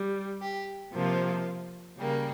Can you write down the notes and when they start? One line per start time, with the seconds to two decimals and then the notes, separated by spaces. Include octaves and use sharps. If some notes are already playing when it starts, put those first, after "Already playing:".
Already playing: G3
0.41 G4
0.93 C3 F3 A#3 F4
1.98 C#3 G3 A#3